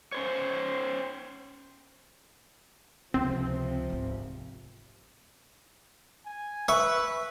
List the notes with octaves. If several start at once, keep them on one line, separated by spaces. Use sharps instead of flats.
C#4 C5 C#5
C#2 C3 F3 C4
G#1 B3
G#5
B4 E5 C#6